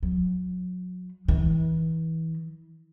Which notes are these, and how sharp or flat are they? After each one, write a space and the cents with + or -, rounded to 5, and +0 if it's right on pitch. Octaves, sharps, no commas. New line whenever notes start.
F#3 -30
E3 -30